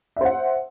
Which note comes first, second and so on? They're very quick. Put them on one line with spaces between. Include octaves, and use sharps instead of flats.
E5 C5 F#5